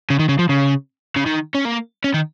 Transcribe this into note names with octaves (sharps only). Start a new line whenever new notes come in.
C#3
D#3
C#3
F3
C#3
C#3
D#3
C#4
A#3
C#4
D#3